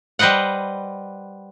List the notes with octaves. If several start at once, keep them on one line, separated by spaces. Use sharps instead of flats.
G3 B4 C5 D#5 F#5